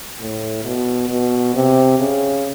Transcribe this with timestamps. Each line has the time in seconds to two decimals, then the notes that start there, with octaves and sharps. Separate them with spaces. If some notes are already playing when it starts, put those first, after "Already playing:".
0.20 A2
0.64 B2
1.09 B2
1.54 C3
1.99 C#3